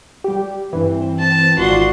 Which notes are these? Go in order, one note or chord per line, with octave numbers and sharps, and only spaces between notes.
G3 G4
G2 E3 C4
A5
G#1 F4 F#4 D5 C6